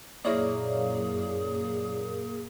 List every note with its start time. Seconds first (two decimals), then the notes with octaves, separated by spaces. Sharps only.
0.25 F#2 A#2 A#3 E4 G#4 C#5 D5